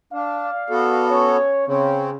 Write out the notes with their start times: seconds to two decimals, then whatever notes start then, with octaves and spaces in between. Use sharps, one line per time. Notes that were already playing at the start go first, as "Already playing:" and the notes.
0.13 D4 D5 F5
0.70 B3 F#4 A4
1.10 C#4 C#5
1.67 C#3 C4 C#4